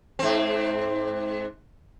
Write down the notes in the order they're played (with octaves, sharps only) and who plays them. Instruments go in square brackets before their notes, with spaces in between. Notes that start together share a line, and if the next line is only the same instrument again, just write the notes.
[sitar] G#2 C4